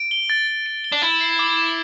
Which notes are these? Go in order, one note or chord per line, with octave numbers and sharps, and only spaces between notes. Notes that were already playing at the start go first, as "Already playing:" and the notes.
Already playing: D7
G7
A6
A6
D7
G7
D4
E4 A6
C7
D6
E7